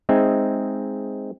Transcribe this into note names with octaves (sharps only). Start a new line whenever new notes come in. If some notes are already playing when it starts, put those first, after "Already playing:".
G#3 C4 D#4 E5 G#5